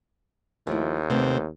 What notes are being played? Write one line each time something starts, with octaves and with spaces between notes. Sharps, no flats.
D#2 F3 A3 E4
C3 A3 B3 C4